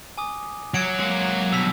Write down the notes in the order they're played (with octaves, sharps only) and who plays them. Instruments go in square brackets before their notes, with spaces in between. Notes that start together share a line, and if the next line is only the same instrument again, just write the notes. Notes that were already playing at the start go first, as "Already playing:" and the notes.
[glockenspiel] G#5 D6 D#6
[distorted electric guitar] F#3 [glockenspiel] G#6 C#7 D7
[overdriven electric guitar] G#3 A#3
[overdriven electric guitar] G2 B2 [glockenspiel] E6 B6